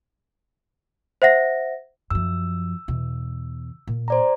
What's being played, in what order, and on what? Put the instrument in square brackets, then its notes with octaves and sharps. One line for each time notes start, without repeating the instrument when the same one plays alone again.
[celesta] C5 E5 F#5 A#6
[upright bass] F#2 F3 [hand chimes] E6
[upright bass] E2 B2
A#2
[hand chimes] C5 D5 A#5